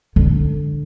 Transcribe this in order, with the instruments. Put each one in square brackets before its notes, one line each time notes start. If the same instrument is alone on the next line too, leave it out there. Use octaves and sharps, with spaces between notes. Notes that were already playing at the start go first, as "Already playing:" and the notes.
[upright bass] D3